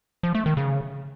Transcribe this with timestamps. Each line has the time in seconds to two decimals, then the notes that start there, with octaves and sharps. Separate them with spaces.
0.23 F3
0.35 A3
0.46 D#3
0.57 C#3